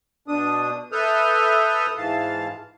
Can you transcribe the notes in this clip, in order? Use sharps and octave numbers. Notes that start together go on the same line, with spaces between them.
B2 D4 D#6
A4 B4 E5 D#6 F6 G6
G#2 E3 F5 A5